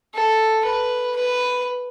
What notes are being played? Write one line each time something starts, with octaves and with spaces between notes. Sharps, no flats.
A4
B4
B4